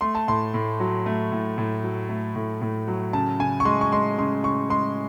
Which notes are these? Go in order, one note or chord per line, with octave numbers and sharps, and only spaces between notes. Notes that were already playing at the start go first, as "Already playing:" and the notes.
A3 C6
A5
A2 C6
A2
F#3
A3
A2
A2
F#3
A3
A2
A2
F#3
C#3 A5
C#3 G#5
C#6
G#3 C6
C#6
G#3 C6
C#3 C6
C#3 C#6
G#3 C6